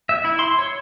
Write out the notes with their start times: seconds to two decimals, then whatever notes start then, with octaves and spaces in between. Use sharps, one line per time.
0.09 E5
0.25 E4
0.39 C6
0.59 C#5